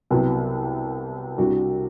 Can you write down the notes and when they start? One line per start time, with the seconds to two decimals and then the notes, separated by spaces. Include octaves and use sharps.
0.10 C2 C3 F#3 B3
1.38 C2 C3 G3 D4 F#4